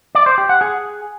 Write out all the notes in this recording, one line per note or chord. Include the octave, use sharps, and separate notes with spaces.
D5
C5
G4
F#5
G#4